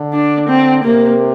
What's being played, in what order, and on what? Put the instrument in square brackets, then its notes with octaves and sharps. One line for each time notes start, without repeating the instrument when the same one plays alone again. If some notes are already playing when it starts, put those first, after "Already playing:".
Already playing: [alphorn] D3
[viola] D4
C4
[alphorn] C3 [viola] A#3